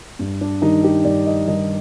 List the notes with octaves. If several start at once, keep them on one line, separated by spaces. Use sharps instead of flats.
G2
D4
D#3 G3 D#4
G4
G2 D5
D#5
D#3 G3 D#5